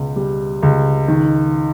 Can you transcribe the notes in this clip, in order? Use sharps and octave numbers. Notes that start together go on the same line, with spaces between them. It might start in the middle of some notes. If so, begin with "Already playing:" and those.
Already playing: C#2 B2
G3
C#2
D#3